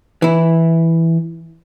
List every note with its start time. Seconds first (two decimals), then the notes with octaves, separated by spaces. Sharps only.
0.22 E3 E4